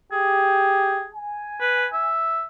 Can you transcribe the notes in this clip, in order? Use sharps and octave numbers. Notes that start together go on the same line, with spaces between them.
G4 G#4
G#5
B4
E5